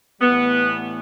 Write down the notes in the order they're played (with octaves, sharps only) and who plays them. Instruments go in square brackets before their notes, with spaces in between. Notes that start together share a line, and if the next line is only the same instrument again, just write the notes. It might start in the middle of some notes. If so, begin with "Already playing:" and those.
[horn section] A2 E3 G3 B3